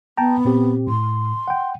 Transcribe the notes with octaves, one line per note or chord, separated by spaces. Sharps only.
B3 G5 A5 A#5
A#2 C4 G4
A2 C6
F#5 G5